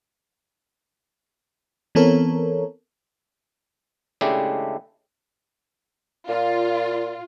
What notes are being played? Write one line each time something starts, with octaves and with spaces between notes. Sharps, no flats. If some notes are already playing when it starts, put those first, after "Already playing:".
E3 B3 C4 A4 A#4 C#5
C#3 G#3 A3 D4 E4 G4
A#2 F4